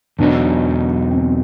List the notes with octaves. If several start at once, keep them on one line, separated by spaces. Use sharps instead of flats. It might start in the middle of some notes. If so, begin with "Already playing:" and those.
E2 B2 F#3 B3 D4 D#4
C4